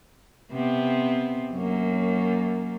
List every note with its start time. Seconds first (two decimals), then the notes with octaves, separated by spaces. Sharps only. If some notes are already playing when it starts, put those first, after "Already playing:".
0.52 C3 B3 C4
1.52 F#2 F#3 A#3